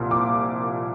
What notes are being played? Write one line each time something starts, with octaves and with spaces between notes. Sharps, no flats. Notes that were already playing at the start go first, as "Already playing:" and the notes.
Already playing: C2 A#2 F3
D6